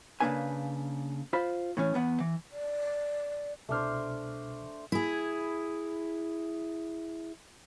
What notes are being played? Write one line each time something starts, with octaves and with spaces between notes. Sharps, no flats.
C#3 A3 A#3 D4 B4 G#5
F4 C5 B5
A2 E3 C#4
E2 B3 F#5
E3
D5
C2 B2 A3 D4 C5 F6
E4 G#4